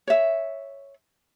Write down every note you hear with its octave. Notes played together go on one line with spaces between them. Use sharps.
C#5 E5